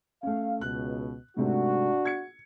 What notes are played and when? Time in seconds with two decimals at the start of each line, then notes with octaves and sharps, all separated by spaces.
0.23 A3 C#4 F5
0.61 C#2 B2 F#6
1.37 G#2 C3 A3 D4 F#4
2.05 G#6 C#7